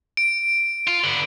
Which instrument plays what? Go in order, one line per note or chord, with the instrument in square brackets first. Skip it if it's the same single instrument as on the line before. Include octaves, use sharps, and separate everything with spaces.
[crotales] D7
[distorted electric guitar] F4
D3 B3